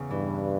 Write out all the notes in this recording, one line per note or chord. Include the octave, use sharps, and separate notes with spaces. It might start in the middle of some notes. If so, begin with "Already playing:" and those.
Already playing: E2 C#3
G2 E3